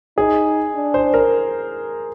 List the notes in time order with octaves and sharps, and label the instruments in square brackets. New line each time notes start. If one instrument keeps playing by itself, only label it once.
[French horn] D#4 [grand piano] G#4
[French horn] D4
[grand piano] C5
A#4